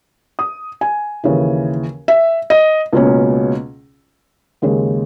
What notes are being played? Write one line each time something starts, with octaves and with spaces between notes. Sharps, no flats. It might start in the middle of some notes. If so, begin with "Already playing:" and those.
D#6
G#5
D#2 C#3 E3
E5
D#5
C#2 B2 A#3 C#4
D#2 C#3 G#3